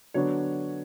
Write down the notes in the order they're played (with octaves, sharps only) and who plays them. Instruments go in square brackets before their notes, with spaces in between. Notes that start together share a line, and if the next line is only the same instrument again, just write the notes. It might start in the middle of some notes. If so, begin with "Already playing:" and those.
[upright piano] D3 F#3 B3 D4 C#5